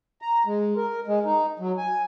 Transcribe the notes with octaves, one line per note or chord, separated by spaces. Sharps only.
A#5
G#3
A#4
G#3
D#4
F#3
G#5